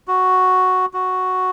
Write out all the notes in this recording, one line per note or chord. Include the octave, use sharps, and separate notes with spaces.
F#4
F#4